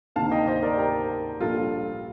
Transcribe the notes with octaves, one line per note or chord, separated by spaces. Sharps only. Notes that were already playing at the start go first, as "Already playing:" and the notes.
D2 C3 D#3 A#3 F5 A5
D#5 G5
C5 D#5
A#4 D5
G4 A#4
A#1 A#2 G3 F4 A4